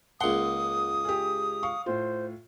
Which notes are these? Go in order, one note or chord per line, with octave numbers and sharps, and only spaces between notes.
C#2 A#3 F#5 C6 D#6
G4 G#4
F5 C#6
A2 F4 C5